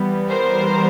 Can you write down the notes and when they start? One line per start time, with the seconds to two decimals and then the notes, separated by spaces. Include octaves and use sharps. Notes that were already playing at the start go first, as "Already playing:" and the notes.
Already playing: E3 G3 B3
0.29 A#4 C5